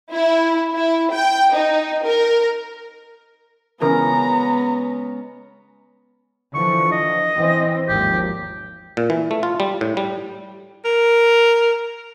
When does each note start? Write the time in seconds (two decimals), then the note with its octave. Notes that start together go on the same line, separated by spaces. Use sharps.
0.13 E4
0.74 E4
1.13 G5
1.55 D#4
2.06 A#4
3.82 C#3 E3 G#3 B3 C#4 A#4 A#5
6.54 D3 E3 F3 C#6
6.92 D#5
7.35 E3 C4
7.88 G#1 D#2 F3 G4
8.97 A#2
9.10 E3
9.31 A3
9.43 F4
9.60 G3
9.81 A2
9.97 G3
10.85 A#4